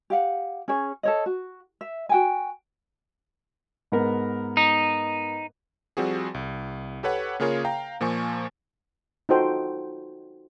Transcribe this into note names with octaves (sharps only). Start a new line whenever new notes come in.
G4 F5 F#5
C#4 G#4 C#5
A4 C#5 D#5
F#4
E5
F#4 G5 G#5
G#2 B3 A#4
D#4
F3 G3 C4 F#4 G#4
C2
G4 A4 B4 C#5 F#5
C#3 A#3 F4 G#4 A#4 C#5
F5 G5 A#5
A#2 F3 A#3 G#5 C#6
D#4 F4 F#4 A4 C5 G5